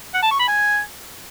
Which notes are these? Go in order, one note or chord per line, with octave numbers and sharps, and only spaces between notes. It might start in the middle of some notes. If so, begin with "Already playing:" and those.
F#5
A5
C#6
B5
G#5